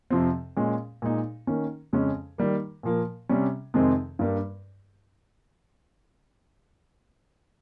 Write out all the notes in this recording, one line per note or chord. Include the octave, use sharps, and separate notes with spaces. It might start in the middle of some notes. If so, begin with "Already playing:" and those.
F2 C3 F3 C4
A#2 G#3 C#4
A#2 G#3 D#4
D#3 A#3 C#4
F2 C#3 G#3 C#4
D#3 G3 A#3
A#2 F3 A#3
C3 G3 C#4
F2 C3 D#3 G#3 C4
G2 G3 A#3